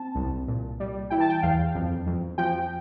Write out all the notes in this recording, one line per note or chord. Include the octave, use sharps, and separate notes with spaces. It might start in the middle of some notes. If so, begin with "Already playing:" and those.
Already playing: C4 A5
C2
A#2
G3
E3 G5
A5
G5
E2 F5
F2
F2
F3 G5